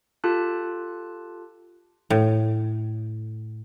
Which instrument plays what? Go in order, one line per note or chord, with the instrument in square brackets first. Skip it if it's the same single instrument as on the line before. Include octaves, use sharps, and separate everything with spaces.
[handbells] F4 G4 A4 A5 F#6
[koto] A2